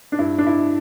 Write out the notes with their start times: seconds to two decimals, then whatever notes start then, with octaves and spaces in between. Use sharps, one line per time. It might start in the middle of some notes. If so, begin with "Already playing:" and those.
0.12 D4
0.19 G2 E4
0.38 D4
0.47 E4